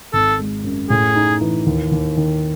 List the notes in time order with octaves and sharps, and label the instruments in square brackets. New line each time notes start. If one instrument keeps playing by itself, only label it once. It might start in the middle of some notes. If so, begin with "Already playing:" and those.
[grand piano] G#1 [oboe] A4
[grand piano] G#3
F#2
[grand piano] A2 [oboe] G#4
[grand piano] D#4
E3
D#2
D#2
D#3